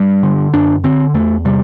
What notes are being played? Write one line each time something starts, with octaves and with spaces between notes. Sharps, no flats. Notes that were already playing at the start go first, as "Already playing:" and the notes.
Already playing: G2 G3
D3
F#2 D4
D3 C4
E2 A3
C3 G3